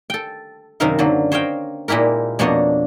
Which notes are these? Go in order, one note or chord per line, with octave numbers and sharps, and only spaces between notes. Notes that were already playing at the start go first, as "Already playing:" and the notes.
A4 G5
F#2 C3 D#3 D#4 A#4 F5
D3 F#3 A#3
C5 C#5 D#5 F5 G5
A#2 G#3 E4 G4 A#4
F2 B2 A#3 D4 C#5 D#5